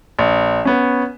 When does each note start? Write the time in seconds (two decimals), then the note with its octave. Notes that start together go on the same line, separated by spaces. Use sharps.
0.19 A#1
0.65 B3 C#4